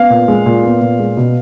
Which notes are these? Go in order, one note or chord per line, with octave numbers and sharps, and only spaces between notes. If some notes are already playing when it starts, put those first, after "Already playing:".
Already playing: B3 F5
A#2
G#3
A#2
B3
A#2
G#3
B2